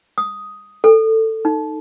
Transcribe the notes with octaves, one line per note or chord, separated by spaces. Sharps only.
D#6
A4
D#4